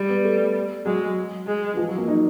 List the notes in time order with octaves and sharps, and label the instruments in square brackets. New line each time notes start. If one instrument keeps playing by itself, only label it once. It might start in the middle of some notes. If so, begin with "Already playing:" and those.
Already playing: [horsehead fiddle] G3
[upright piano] B3
A3
[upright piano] F#3 [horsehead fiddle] G#3
[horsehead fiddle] G#3
[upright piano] E3
F3
F#3
A#3
D#4